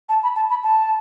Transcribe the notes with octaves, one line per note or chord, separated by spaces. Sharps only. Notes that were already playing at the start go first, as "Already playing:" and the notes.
A5
B5
A5
B5
A5